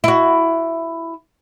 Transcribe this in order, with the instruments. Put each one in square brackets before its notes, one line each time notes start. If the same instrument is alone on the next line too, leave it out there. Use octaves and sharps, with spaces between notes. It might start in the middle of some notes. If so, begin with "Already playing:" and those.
[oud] E4 F#4